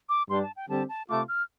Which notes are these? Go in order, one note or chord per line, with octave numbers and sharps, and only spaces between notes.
D6
G2 G3 D4 C6
A5
G5
D3 G3 C4 G4 A5
A5
C3 A3 F4 D6
F6